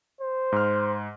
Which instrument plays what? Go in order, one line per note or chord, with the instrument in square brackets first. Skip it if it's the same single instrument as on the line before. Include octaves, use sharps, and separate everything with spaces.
[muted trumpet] C5
[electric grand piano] G#2 F6